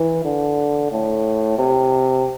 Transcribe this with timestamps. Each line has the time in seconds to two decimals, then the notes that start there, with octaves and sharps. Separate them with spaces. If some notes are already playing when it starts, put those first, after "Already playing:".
Already playing: E3
0.25 D3
0.92 A2
1.58 C3